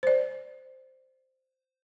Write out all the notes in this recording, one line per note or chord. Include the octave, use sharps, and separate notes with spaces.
C5 D5